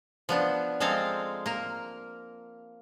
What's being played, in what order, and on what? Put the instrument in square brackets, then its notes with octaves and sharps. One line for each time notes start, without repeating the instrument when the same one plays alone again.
[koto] F3 B3 D4
F3 G#3 C4 A4 F5 A#5
A#3 A#4